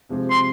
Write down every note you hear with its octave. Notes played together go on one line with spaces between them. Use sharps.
C3 F3 G#3 C4
C6